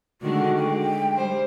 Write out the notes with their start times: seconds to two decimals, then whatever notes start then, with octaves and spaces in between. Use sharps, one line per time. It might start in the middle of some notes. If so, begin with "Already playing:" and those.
0.22 D3 D#3 G#3 F#4
0.56 G#3 G5
1.16 G3 C5